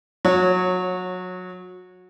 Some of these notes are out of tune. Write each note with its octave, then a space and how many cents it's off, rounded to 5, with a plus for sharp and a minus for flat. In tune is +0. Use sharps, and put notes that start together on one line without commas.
F#3 -25 C#5 -10